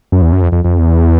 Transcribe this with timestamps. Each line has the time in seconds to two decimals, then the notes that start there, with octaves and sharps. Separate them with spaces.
0.12 F#2
0.22 E2
0.32 F#2
0.42 F2
0.52 F2
0.64 F2
0.79 E2